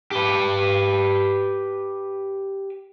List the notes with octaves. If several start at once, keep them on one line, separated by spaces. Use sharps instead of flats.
G4 B4